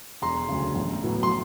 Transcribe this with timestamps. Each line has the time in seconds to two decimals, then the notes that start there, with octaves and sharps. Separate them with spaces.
0.22 E1 A#5 C6
0.49 D2 C#3
0.75 A1
1.03 A2 F#3 B3
1.23 C6